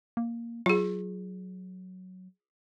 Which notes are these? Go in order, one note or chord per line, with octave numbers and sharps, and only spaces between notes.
A#3
F#3 F4 G#4